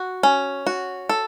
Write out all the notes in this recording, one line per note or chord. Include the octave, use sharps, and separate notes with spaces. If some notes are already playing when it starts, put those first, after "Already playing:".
Already playing: F#4
C#4
F#4
A4